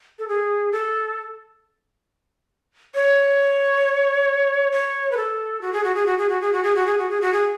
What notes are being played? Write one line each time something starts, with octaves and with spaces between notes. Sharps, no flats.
A4
G#4
A4
C#5
C#5
B4
A4
F#4
G#4
F#4
G#4
F#4
G#4
F#4
G#4
F#4
G#4
F#4
G#4
F#4
G#4
F#4
G#4